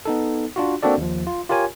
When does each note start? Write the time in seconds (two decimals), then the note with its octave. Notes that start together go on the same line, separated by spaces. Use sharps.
0.05 B3 D#4 A4
0.56 D4 F4 F#4
0.83 A#3 C4 D4 F#4 A4 D5
0.98 D#2 F3
1.27 F4
1.49 F4 G4 A#4 C#5 G#5